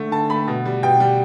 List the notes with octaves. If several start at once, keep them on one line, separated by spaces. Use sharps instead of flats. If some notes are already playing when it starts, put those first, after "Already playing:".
Already playing: D3 A3
D3 A5
A3 B5
B2
G3
B2 G5
G3